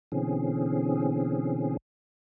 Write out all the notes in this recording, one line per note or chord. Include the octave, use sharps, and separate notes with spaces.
B2 D3 E3 C4 C#4 G#4